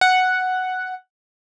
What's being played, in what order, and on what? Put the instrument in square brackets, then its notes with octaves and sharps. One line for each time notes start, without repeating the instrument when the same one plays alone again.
[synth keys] F#5